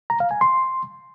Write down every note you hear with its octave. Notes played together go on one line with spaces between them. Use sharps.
A#5
F5
G#5
C6